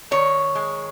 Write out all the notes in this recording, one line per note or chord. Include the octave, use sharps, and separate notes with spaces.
D#3 C#5
G#3